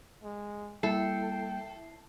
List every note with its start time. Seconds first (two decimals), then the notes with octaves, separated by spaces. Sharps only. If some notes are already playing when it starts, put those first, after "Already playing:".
0.24 G#3
0.83 G3 A#3 E4 A4 G5 C7